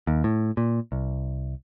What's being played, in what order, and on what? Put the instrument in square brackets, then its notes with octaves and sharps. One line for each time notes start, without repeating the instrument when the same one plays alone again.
[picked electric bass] D#2
A2
A#2
C2